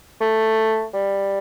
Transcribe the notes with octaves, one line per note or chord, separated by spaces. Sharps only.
A3
G3